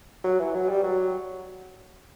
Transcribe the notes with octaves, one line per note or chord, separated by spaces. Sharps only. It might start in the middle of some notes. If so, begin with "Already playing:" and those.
F#3
E3
F#3
G3
F#3